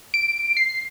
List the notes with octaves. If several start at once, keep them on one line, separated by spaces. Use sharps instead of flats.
D7
C7